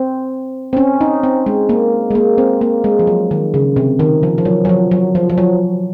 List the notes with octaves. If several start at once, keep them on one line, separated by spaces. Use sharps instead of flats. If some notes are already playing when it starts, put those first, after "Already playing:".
Already playing: C4
C4
C#4
D#4
C4
G#3
A#3
G#3
A#3
C4
A#3
G#3
F3
F#3
D#3
C#3
C3
D#3
F3
F3
F#3
F#3
F3
F#3
F3
F3
F#3